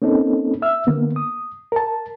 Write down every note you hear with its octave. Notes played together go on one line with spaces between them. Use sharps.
A#3 C4 C#4 D#4 A4
E5 E6 F6
D3 A#3 B3
D#6
A#4 A5